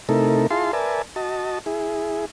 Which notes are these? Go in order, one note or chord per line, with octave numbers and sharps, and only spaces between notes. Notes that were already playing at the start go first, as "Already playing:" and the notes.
C3 A3 D#4 E4 A4 A#4
E4 F4 G#4 F5 A5 C6
A#4 B4 D5 E5 G#5 A5
F#4 D#5 A5
E4 G#4